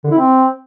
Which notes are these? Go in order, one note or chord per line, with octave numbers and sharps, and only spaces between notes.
D3
E4
C4